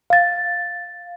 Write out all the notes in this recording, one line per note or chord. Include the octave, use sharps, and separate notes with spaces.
F5 A6